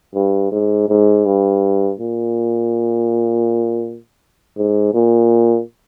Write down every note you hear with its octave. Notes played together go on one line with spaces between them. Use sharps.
G2
G#2
G#2
G2
A#2
G#2
A#2